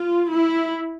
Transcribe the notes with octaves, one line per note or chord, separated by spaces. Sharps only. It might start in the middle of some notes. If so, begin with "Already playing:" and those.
Already playing: F4
E4